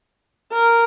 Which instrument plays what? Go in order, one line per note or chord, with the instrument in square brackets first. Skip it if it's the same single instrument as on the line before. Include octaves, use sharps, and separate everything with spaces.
[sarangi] A#4